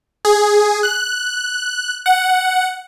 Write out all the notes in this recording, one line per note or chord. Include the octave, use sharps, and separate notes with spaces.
G#4
F#6
F#5